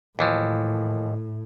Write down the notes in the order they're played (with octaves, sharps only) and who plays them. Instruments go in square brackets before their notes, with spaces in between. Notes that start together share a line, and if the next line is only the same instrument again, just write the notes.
[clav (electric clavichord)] D#2 E3 F3 [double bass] A2